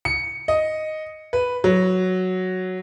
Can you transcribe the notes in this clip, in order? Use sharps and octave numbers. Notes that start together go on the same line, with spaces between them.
C#7
D#5
B4
F#3